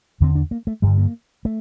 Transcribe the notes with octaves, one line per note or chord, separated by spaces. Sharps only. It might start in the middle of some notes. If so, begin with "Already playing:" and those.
E2 D3 C4
D4
A#3
A3
G2 D3 G3
A#3
A3